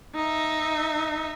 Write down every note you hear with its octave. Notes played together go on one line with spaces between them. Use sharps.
D#4 E5